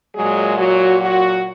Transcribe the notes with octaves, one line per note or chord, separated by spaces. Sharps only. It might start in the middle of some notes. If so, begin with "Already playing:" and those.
A#2 F#3 G#3 G#4
F#3 F#4
F#3 F#4